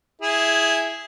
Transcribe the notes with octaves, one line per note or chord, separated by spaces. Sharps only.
E4 G#4